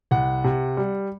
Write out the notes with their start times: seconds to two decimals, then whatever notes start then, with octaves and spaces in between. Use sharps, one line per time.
0.11 C2 F#5
0.44 C3
0.77 G3